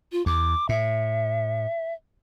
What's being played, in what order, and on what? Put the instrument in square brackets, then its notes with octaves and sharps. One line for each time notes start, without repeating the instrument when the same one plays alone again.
[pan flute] F4
[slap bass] E2 [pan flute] D6
[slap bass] A2 [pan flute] E5